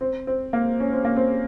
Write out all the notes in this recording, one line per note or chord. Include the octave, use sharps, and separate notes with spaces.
C4
C4
A#3
C#4
C4
A#3
C4